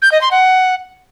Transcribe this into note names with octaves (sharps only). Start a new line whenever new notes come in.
G6
D#5
C6
F#5